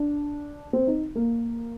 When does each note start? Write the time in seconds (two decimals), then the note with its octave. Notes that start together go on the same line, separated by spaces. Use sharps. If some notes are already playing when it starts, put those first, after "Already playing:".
Already playing: D4
0.73 C4
0.87 D#4
1.15 A#3